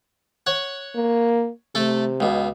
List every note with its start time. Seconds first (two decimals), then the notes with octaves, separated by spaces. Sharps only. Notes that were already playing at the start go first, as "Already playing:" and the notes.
0.47 C#5 F#5
0.96 A#3
1.75 C3 A3 A4
2.20 C#2 B2